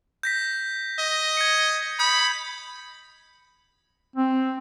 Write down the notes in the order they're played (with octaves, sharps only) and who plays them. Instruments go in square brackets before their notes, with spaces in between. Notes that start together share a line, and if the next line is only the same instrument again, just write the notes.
[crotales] G6 A#6 B6
[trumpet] D#5
[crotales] G#6 C#7
[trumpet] B5 [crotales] D#6 G6 C#7
[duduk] C4